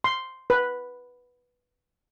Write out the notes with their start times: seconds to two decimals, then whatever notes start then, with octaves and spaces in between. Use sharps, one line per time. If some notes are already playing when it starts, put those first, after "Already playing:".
0.04 C6
0.50 B4